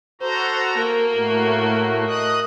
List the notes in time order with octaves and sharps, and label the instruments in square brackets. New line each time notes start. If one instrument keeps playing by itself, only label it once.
[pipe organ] F#4 A4 A#5 [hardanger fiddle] C5
[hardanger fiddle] A#3
[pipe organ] A2 A3 F#4
D#5 D#6 F#6